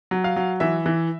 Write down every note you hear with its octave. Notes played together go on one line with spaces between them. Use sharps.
F#3
F5
F#3
E3 E5
E3